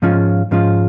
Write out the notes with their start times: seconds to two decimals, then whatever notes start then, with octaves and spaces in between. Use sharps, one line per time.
0.02 G#2 F3 G#3 C#4 F4
0.51 G#2 F3 G#3 C#4 F4